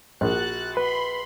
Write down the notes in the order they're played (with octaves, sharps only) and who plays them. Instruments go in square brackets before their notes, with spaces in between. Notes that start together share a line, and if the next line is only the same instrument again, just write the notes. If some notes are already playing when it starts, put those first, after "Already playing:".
[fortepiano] A#1 [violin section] F#4 F#6 A6
[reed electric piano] B4 [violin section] B5 C6